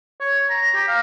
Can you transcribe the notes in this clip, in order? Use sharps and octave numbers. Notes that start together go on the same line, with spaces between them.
C#5
A#5
G4
F5